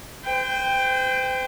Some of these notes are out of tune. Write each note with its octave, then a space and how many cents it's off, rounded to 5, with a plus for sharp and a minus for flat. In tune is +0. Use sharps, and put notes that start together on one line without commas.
C5 -35 G5 +10